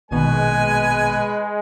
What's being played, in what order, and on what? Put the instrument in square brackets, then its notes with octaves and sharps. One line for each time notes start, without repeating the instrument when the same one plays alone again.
[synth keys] A#1 B2 D#3 [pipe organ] G#3 [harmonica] B4 G#5